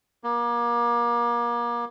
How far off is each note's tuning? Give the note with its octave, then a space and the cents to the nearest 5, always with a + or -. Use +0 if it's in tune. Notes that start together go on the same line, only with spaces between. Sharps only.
A#3 +30